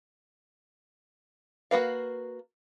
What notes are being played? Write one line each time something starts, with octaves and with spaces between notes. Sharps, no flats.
A#3 F#4 B4 F5